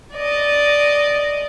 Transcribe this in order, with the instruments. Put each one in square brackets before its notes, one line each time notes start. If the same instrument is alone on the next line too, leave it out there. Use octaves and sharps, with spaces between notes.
[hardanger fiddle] D5 D#5